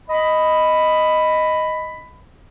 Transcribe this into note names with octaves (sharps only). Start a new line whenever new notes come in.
D#5 B5